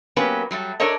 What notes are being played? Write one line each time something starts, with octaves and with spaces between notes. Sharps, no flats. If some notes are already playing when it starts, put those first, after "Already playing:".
F#3 A#3 B3 C#4 G4 B4
F#3 G3 A3
D4 A4 A#4 C#5 D#5